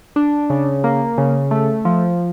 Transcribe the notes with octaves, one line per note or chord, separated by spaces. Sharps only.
D4
C#3
A#3
C#3
A3
F3